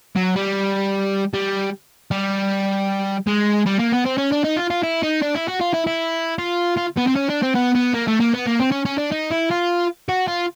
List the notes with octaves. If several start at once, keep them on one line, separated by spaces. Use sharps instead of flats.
F#3
G3
G3
G3
G#3
G3
A#3
B3
C4
C#4
D4
D#4
F4
F4
E4
D#4
D4
E4
F#4
F4
E4
E4
F4
F4
B3
C4
C#4
D4
C4
B3
B3
A#3
A3
A#3
B3
A#3
C4
C#4
C#4
D4
D#4
E4
F4
F#4
F4